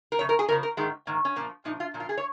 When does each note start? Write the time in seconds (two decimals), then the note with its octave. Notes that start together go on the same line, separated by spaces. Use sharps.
0.12 A#4
0.19 F2 C#3 C#5
0.29 A#4
0.39 G#4
0.48 F2 C#3 F3 A#4
0.63 A#4
0.77 G#2 D#3 G#3
1.07 G#2 D#3 A#3
1.25 C#4
1.36 A#2 A#3
1.40 F3
1.65 A#2 F3 D#4
1.80 F4
1.94 A#2 F3
2.00 F4
2.09 G#4
2.17 C#5